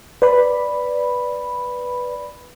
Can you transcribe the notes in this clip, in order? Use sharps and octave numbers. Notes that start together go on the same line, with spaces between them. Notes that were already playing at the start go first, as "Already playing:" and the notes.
B4 D5 B5